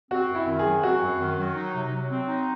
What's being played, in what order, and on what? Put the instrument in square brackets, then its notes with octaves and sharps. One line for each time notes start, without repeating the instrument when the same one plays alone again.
[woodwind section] C4 [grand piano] F#4
[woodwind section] F#2
[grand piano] E4
[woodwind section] D#3
[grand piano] G#4
[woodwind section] F#3
[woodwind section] C4 [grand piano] F#4
[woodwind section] F#2
D#3
F#3
D#4
C3
F#3
C4
D#4